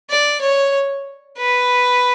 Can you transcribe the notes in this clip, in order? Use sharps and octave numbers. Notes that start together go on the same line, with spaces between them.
D5
C#5
B4